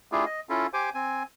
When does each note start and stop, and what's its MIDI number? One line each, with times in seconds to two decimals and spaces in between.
0.12 0.25 57
0.12 0.25 62
0.12 0.25 64
0.12 0.25 65
0.12 0.25 67
0.12 0.25 68
0.26 0.40 75
0.49 0.67 61
0.49 0.67 64
0.49 0.67 65
0.49 0.67 69
0.73 0.90 67
0.73 0.90 72
0.73 0.90 80
0.73 0.90 86
0.94 1.23 60
0.94 1.23 80